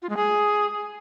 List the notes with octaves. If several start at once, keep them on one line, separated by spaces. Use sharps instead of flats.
F4
G#3
G#4